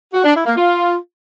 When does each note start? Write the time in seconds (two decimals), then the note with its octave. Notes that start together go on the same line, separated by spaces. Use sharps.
0.14 F#4
0.25 D4
0.35 E4
0.46 A#3
0.57 F4